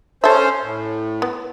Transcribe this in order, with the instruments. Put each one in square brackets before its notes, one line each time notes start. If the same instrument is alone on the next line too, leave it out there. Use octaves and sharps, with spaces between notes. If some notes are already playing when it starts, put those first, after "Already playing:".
[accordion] C#4 C5 [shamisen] A4 E5
[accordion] A2
[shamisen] B3